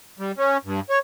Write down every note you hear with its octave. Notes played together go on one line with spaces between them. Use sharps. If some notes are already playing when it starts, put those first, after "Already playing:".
G3
C#4
G2
C#5